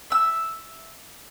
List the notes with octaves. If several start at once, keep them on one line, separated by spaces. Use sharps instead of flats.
E5 E6